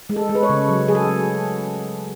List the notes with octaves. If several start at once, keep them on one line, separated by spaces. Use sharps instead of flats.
G#3
A4
G#3
B4
C#5
C#3
F#3
F#3 G#4
A4
F#3